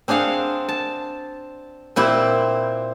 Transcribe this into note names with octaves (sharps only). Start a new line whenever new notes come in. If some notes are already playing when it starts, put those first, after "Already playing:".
C4 D4 G#4 F5 F#5
A5
A#2 C4 E4 G4